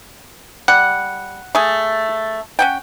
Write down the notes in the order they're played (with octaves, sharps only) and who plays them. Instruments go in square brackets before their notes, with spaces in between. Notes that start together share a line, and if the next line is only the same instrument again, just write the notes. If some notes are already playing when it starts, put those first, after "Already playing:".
[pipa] G3 [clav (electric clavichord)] F#5
[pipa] A3 G#4
C#4 F#5 G5